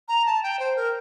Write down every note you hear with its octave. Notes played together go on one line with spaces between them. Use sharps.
A#5
A5
G5
C5
A#4